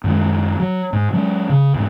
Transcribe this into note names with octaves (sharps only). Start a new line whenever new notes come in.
F#2 D#3 G#3
F#3
G#2
F#3 G#3 C#4
C#3
E2 G#2